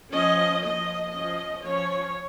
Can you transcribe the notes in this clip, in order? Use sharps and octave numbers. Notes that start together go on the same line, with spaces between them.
F3 C#4 D#5
F3 A#3 C#4 D#5
F3 C#4 D#5
F3 C#4 C#5